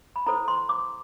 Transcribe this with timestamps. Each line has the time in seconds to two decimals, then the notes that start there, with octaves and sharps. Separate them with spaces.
0.16 B5
0.26 E4 A4 C5 A#5
0.48 C6
0.69 D6